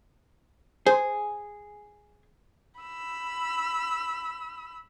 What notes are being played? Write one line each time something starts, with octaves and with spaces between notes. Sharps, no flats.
G#4 C5
B5 E6